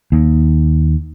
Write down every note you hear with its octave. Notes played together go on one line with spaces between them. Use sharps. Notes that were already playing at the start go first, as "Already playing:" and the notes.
D#2